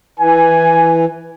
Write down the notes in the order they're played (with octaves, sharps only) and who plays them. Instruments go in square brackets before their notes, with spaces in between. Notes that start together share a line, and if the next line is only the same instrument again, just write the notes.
[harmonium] E3 [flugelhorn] G#5